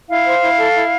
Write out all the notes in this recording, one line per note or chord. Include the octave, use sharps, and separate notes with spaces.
E4 F5
C5
E4
A4
E4